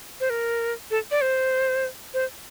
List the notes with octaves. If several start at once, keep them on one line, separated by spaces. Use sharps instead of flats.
C5
A#4
A4
D5
C5
C5